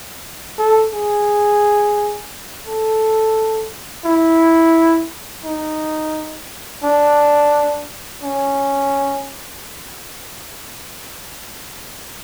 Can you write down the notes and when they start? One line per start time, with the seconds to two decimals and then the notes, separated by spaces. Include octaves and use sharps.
0.59 A4
0.93 G#4
2.67 A4
4.05 E4
5.45 D#4
6.84 D4
8.23 C#4